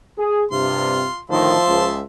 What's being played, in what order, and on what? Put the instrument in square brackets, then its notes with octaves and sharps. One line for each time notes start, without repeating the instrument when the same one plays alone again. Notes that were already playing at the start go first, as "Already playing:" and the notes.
[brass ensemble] G#4
[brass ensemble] G2 C3 [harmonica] F4 C6
[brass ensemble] D2 A2 D#3 [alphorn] F3 [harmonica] E5 A5 C6
[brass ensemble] C#2